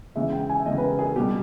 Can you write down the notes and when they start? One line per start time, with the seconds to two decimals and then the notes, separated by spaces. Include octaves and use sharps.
0.15 E2 C#3 G#3 E5
0.32 G5
0.49 G#5
0.59 E5
0.66 E2 C#3 G#3 D#5
0.78 B4
0.83 A#4
0.99 G#4
1.16 B2 G3 G4